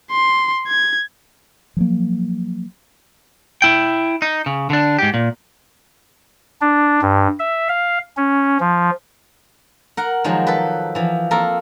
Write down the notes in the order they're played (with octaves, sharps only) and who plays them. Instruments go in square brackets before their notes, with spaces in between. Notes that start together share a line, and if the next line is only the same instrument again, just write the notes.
[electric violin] C6
G#6
[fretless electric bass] F3 F#3 A#3
[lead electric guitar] E4 G5
D#4
C#3
D3 D4
G#2 G4
A#2
[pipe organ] D4
G2
E5
F5
C#4
F3
[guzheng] A#4 F#5
D#3 F3 F#3 G#3
A4 B4
E3 F3
A#3 C4 A4 A#4